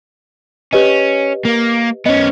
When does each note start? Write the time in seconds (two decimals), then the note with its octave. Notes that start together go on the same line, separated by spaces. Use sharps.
0.73 C#4 G4 B4 D#5
1.45 A#3
2.06 B3 C#4 D#5